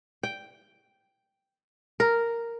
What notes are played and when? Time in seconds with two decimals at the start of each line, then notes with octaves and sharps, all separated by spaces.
0.23 G5
2.00 A#4